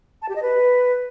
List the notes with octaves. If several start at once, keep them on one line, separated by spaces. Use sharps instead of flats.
A5
G4
D#5
B4